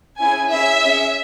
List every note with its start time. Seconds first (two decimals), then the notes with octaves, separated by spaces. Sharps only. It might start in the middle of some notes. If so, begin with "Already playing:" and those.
0.19 C#4 E4 G#4 G#5
0.50 C#4 E4 G#4 E5
0.81 C#4 G#4